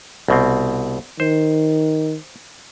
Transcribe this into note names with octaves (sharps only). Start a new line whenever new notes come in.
C2 B2 C4
D#3 C5